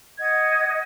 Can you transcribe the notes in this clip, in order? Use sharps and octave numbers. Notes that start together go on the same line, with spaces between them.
D#5 F#5 G#6